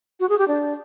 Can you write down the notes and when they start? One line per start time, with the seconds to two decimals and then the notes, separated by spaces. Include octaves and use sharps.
0.20 F#4
0.29 G#4
0.39 G4
0.48 D4